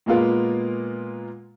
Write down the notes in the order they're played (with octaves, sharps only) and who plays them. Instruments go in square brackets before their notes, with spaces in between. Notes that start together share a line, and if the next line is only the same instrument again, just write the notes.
[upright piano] A#2 G#3 A#3 B3 F4 A#4